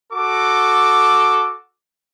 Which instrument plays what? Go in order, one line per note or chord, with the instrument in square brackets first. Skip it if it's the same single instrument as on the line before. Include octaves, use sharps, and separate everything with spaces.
[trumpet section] F#4 A4 D6